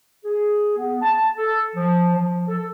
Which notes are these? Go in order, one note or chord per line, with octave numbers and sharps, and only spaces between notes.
G#4
B3
A5
A4
F3
F3
A4